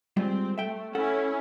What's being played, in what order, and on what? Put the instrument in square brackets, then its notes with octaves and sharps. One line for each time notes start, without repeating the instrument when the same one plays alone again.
[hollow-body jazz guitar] G3 G#3 F4 [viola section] C4
[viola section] A3 [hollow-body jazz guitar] E5 G5
[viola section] C#4 E4 [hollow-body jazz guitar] A4 F#5